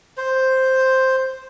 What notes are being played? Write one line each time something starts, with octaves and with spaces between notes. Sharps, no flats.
C5